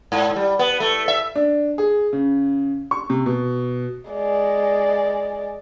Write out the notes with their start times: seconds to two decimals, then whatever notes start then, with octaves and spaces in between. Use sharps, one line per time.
0.12 G#2
0.36 G3
0.59 B3
0.80 A3
1.08 E5
1.35 D4
1.78 G#4
2.13 C#3
2.91 C#6
3.10 C3
3.26 B2
4.10 G#3 D5